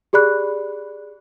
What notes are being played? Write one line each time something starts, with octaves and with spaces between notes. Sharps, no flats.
G4 G#4 D5 B5 F#6